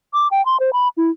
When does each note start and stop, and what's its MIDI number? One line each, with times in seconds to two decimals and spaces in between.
0.13 0.28 86
0.31 0.44 79
0.46 0.57 84
0.60 0.73 72
0.73 0.88 83
0.97 1.11 64